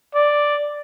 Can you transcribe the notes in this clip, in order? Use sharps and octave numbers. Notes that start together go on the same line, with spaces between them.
D5